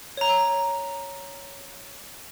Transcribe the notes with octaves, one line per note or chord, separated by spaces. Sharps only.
C#5 A#5